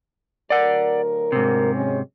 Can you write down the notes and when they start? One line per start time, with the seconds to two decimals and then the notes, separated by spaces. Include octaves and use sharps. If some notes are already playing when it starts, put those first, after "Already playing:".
0.50 D2 F#3 A#4 D5 F#5
1.32 G#2 C3
1.74 F#3 G#3 C#4